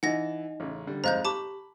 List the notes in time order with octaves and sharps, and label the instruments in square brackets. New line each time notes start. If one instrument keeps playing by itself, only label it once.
[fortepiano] E3 [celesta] D#4 D#5 [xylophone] F#5 A#6
[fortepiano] A1 C#3
D3 G3
[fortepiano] F2 G#2 [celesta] C5 D#5 F5 [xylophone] A#5 F#6 G6
[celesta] G4 [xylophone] A5 D6 [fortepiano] B5